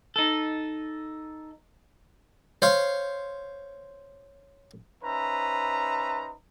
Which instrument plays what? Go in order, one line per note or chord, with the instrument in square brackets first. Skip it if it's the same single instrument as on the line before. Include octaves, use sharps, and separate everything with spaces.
[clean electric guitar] D#4 A4
[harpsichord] C5 C#5 F5
[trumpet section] C#4 D#4 B4 C5 E5 A#5